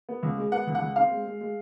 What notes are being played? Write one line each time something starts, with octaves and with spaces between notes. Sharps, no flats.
B3
C#2
G#3
B3 F#5
C#2
F#5
C#2
C4 F5
G#3
G#3
G#3